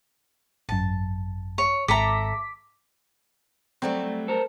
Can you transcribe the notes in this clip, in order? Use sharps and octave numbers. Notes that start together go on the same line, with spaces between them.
G#1 F#2 A5
C#5
G#1 A4 E5 A#5 D6 B6
F#3 G3 A3 C4
A4 A#4 C5